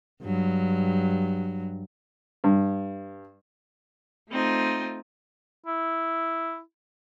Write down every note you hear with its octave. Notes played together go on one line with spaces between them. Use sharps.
G2 F#3
G2
A3 C4 D#4 F4
E4